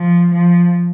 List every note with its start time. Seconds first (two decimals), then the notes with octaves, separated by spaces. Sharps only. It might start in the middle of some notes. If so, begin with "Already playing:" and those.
Already playing: F3
0.34 F3